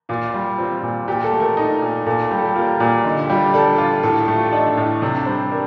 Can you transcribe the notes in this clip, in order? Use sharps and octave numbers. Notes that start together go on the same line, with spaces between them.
A#2 F4
G3
C4 F4
A#2
A#2 G4
A4
A3
A#4
D#4
A#2
A#2 A4
G3 G4
A4
G4
A#3 F4
A#2
D3 D#4
G4
G3 F4
D4 A4
F4
A2 A4
G4
A3
F4
D4 D#4
A2
C3 D4
G3 C5
D4 A#4